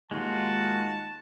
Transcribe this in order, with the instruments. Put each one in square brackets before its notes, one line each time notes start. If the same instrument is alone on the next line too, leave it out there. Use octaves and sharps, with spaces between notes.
[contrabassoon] D#2 [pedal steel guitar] G#3 F4 [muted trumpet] F#4 [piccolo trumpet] A5